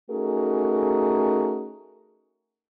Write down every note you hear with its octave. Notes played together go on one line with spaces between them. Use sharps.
A3 C#4 D#4 F#4 G#4 A#4